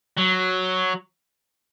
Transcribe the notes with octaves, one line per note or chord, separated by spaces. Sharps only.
F#3